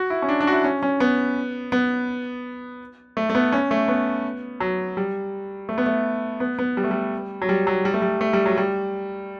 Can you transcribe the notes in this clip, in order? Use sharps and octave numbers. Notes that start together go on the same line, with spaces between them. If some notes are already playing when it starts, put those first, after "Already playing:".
Already playing: F#4
E4
C#4
D4
D4
F#4
E4
C#4
C#4
B3
B3
A3
A3
B3
C#4
A3
B3
F#3
G3
A3
B3
A3
B3
B3
G3
A3
G3
F#3
G3
F#3
G3
A3
G3
A3
G3
F#3
G3